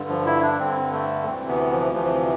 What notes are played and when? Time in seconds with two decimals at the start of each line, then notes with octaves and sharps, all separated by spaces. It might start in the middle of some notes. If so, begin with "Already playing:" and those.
Already playing: G2 D3
0.09 F3
0.26 E4
0.42 D4
0.60 G2 D3 C4
0.93 A3
1.26 D2 C3 E3 C4
1.49 B3
1.71 F3
1.93 D2 C3 E3 F3